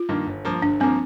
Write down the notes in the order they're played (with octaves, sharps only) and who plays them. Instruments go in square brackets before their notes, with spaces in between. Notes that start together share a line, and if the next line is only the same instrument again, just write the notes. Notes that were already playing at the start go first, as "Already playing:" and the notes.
Already playing: [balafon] F4
[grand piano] G2 D#3 A#3
G1
G2 F3 A#3
[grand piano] G1 [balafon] D4
[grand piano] G2 F3 A#3 [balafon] C4